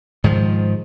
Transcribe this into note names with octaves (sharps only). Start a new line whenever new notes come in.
G#2 D#3 F3